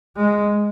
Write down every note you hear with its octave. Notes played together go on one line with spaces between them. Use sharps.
G#3